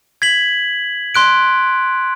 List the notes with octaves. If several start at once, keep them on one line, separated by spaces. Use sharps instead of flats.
G#6 B6 F#7
C6 F#6 D7